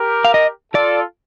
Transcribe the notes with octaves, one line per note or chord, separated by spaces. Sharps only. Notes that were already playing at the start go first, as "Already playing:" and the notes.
Already playing: G4 A#4
F5
D#5
F4 A4 D5